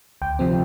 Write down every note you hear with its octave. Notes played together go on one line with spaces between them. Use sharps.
D2 G5
C3 F3 C4